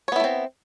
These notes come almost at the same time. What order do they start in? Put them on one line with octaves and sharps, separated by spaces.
C#5 B3 E4 A3 C4